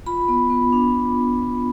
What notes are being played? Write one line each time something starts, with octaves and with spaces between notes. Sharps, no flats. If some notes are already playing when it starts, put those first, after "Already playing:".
F4 B5
B3
B3
D4